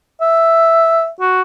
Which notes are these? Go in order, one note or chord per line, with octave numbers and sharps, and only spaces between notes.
E5
F#4